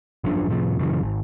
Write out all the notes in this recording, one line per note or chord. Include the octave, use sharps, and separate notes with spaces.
G#1 F#2 F3 D4
A2 C3 F3
F#2 C#3 E3
G#1